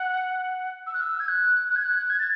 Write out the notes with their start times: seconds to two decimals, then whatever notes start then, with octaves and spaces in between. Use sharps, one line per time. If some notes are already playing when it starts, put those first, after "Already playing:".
Already playing: F#5
0.87 E6
0.93 F#6
1.01 E6
1.20 G#6
1.28 F#6
1.69 F#6
1.76 G#6
1.84 F#6
2.10 G#6
2.19 A6